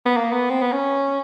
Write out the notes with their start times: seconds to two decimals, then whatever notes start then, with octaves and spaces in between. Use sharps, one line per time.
0.06 B3
0.17 A#3
0.33 B3
0.50 C4
0.62 B3
0.72 C#4